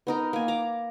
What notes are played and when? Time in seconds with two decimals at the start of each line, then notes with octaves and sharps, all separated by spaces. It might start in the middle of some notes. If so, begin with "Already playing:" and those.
0.07 B3 D#4 A#4
0.33 A#3 G#5
0.48 A#5 D6